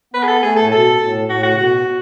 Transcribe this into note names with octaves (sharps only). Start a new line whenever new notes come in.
B3 B4
G#4
A4
A3 G#4
A2 A4
B2 A4
A2
A2 F#4
F#4
C#3
B2 F#4